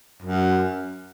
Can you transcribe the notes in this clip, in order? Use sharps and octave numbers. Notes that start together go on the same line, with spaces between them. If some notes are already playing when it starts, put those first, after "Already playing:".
F#2